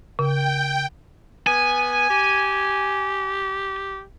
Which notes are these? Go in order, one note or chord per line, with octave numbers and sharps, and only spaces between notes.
C#3 G5
B3 G#5
G4